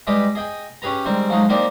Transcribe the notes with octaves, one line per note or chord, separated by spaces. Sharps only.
G3 G#3 G4 B4 D#5
G#4 D#5 G5 G#5
C#4 G4 G#4 B4 A#5
D#3 G3 G#3 C4
F3 F#3 G#3 D#4
A#3 C4 D4 D#4 G4